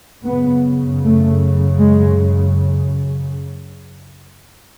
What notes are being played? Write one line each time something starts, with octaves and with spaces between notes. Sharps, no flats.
F#2 C#3 B3
A3
G#3